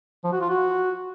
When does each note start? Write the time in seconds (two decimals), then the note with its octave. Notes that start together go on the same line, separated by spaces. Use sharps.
0.24 F3
0.32 F#4
0.41 F4
0.49 F#4